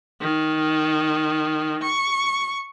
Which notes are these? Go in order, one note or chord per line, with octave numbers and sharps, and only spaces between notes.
D#3
C#6